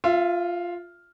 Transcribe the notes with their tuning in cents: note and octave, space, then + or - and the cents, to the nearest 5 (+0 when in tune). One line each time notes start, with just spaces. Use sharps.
F4 +0 E5 +35